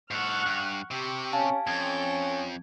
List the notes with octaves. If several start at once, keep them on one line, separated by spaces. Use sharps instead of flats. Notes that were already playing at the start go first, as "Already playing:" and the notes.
G#2 A4 F#5 C#6 F6
G2
C3 G4 C#6
C#4 F5 G#5 A5
F2 C#4 A4 G5 G#6